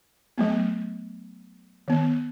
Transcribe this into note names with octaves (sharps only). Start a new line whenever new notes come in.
F#3 A3 B3
D#3 B3